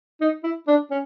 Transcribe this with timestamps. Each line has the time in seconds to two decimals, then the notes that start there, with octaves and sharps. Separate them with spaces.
0.21 D#4
0.43 E4
0.67 D4
0.90 C#4